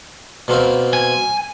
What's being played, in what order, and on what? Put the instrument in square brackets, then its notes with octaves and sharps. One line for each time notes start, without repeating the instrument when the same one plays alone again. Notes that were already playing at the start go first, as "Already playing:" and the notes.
[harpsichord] B2 A#3 C4
[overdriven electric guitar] G#5